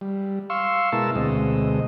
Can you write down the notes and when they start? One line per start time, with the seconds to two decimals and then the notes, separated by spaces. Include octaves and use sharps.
0.01 G3
0.50 F5 C6 C#6 E6
0.92 B2 G#3 E4 A#4 A5 E6
1.15 D2 B2 G#3 C4 D#5